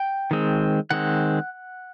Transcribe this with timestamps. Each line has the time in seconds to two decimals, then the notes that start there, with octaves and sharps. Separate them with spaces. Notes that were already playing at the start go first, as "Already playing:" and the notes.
Already playing: G5
0.31 D#3 G#3 C4
0.91 D#3 G#3 C4 F#5